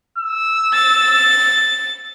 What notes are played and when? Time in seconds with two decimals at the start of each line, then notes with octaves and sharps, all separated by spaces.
0.18 E6
0.74 A6